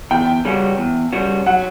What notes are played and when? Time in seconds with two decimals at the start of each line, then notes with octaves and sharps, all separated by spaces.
0.11 E2 G5
0.45 C#3 G3 C#4 F#4
0.78 E2
1.13 C#3 G3 C#4 F#4
1.46 F#3 F#5